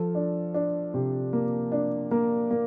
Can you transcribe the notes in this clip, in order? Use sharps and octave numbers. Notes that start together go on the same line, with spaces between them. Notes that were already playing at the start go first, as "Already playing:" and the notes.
Already playing: F3 A4
D4
D4
C3
A#3
D4
A#3 A#4
A#3